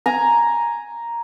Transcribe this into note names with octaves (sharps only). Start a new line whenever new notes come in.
G#5 A#5